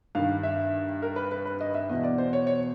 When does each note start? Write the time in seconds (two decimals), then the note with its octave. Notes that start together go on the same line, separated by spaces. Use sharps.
0.15 G2 D#3 F5
0.43 E5
1.02 A#4
1.16 B4
1.32 B4
1.45 B4
1.61 D#5
1.75 E5
1.89 E2 B2 D#5
2.03 D5
2.18 C5
2.33 C#5
2.47 C#5